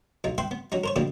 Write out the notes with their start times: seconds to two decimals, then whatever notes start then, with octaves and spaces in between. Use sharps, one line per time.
0.24 B1 D#4
0.38 B4 E5 G5 C6
0.51 B3
0.72 F#3 C#4 D#4
0.84 A#4 C5 C#5
0.96 B2 D3 E3 G3 A#3